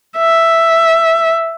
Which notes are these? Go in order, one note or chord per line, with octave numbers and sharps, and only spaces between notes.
E5